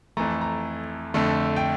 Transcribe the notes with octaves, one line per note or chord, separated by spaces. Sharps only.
F2 E3 A3 A#5
A#5
F2 D3 A3
G5